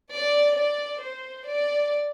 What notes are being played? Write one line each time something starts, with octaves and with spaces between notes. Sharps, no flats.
D5
D5
C5
D5